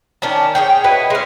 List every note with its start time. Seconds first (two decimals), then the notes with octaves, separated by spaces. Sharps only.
0.22 D#3 C#4 D4 A5
0.55 G#4 C#5 G5
0.84 E4 F#4 B4 D#5
1.10 G#3 C#4